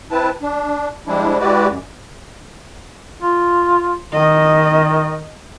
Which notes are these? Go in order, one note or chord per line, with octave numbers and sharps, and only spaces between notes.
C4 E4 B4 A5
D4
F3 G3 G#3 D4 E4
G#3 E4 F#4 G4 B4 D5
F#2
F4
D#3 D#5